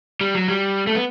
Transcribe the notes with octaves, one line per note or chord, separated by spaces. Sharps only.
G3
F#3
G3
A3
B3